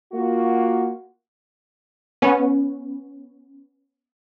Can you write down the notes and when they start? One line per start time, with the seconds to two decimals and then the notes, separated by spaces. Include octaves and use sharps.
0.12 A#3 F4 F#4
2.22 B3 C#4